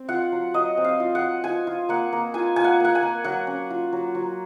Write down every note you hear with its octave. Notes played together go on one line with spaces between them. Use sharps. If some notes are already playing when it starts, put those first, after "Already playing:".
Already playing: C4
F4 F#5
F#3
F#3 D#5
C4
F5
F4
F#5
F#3
F4 G#5
F4
A#3 F#5
A#3
F4 G#5
F4 G#5
F#5
A#3 F#5
G#5
A#3
F#3 F#5
C#4
F4
F#3
F#3